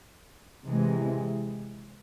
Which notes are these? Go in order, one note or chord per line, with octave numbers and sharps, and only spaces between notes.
C3 E3 G#3